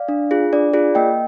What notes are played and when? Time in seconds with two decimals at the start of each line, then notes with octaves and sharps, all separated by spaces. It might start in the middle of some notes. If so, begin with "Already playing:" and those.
Already playing: D5 F5
0.08 D4
0.31 F4 G#4
0.53 D4 D5
0.73 F4 G#4 D5
0.95 A#3 D#5 G5